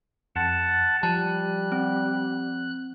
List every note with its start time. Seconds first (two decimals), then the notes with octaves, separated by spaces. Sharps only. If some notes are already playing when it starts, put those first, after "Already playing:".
0.36 F2 F#5 A5
1.03 F3 G3 A5 F#6
1.72 C4